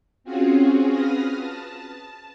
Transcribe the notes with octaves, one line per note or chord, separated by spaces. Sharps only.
C4 C#4 F4 F#4 G#4
B4 D#6 F6 A#6
A5